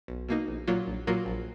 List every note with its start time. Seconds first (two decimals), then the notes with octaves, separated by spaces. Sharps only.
0.08 B1
0.29 B2 A#3 D#4
0.48 A#1
0.67 A#2 F#3 A#3 F4
0.87 A#1
1.07 A#2 F#3 A#3 F4
1.26 A#1